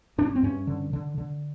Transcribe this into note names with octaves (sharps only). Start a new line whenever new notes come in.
G2 D4
C#4
C4
G2 C#4
D3
D3
D3